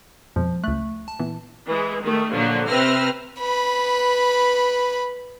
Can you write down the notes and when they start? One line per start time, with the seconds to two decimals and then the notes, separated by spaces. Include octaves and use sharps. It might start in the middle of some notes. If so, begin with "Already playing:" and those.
0.36 F2 B2 F3 G#3
0.64 C#2 A3 F#6
1.08 A5
1.19 A#2 E3 B3
1.67 E3 G#3
2.01 D#3 A3
2.32 A#2 D3 F3 F#3
2.68 C3 C4 B4 E6 F6 A#6
3.41 B4 B5